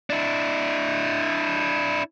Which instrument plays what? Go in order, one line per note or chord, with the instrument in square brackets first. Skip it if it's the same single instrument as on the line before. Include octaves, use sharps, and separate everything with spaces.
[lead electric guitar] D4 E4